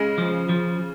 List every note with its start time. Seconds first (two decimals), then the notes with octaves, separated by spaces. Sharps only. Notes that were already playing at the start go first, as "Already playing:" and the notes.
Already playing: C#3 G#3
0.18 F3
0.49 F3